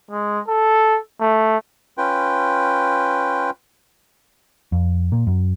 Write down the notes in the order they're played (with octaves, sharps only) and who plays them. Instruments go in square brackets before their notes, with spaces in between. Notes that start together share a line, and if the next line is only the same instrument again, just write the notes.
[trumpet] G#3
A4
A3
[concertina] C#4 F4 B4 G5
[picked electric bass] F2
A#2
F#2